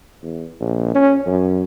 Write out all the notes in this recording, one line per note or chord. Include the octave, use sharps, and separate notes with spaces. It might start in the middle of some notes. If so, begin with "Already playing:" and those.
E2
A#1
C#4
F#2